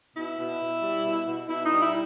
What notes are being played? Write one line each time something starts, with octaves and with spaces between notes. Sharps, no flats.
B2 E4
B2
B2
G3
B2
B2
B2 E4
D#4
G3
E4